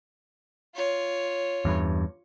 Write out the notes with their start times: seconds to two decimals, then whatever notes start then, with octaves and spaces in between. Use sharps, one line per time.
0.75 F4 C#5
1.65 E2 G2